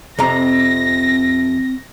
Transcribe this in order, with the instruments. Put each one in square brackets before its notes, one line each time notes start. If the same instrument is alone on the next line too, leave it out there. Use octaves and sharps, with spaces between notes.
[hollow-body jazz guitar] F2 C3 A#5 [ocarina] C4 [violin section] A#6